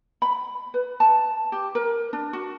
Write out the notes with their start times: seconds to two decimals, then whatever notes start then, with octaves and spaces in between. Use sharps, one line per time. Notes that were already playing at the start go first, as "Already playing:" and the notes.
0.22 B5
0.74 B4
1.00 A5
1.52 G4
1.75 A#4
2.13 D4
2.33 F#4